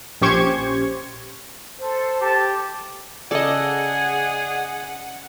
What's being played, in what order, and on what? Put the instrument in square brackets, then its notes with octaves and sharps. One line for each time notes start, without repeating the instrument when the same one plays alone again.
[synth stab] A#1 C#4 G4 C5 C#6 G#6
[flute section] A4 C5
[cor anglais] G4 [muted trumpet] A5
[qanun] C#3 A4 [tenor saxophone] G#4 [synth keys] D5 D#5 [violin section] F#5